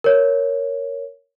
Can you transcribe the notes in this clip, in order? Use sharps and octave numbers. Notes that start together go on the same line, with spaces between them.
A#4 C#5